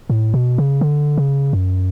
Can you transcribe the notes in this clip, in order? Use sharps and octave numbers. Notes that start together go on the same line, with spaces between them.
A2
B2
C#3
D3
C#3
F#2